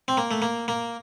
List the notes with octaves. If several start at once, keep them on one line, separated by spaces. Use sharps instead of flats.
C4
A#3
A3
A#3
A#3